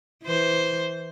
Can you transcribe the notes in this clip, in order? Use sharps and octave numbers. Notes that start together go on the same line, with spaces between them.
E3 C5